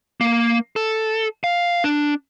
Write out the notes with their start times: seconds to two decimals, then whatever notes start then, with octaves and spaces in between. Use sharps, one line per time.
0.21 A#3
0.76 A4
1.44 F5
1.84 D4